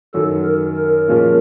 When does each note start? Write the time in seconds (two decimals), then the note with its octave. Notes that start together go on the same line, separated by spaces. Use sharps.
0.14 F#2 D#3 F#3 A4
0.45 A#4
0.77 A#4
1.08 A#2 F3 G#3 C#4 F4